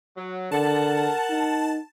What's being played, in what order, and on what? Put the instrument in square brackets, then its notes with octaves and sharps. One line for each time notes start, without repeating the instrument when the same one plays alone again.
[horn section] F#3
[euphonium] D3 [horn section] A#4 F#5 [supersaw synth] A5
[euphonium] D#4